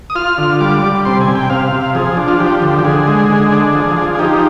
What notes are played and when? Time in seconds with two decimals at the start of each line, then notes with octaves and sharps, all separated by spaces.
0.10 D#6
0.15 F4 F6
0.38 D3
0.60 G3 D6
0.83 G3
1.05 C3 C6
1.21 G#5
1.28 C3
1.35 G5
1.50 C3 F5
1.72 C3
1.95 F3 G#4
2.17 D4
2.28 F4
2.40 F3 G4
2.62 D3
2.79 G4
2.84 D3 G#4
3.07 G#3
3.29 D3
3.52 D4
3.74 F3
3.97 F3
4.15 G#4
4.19 D#4 G4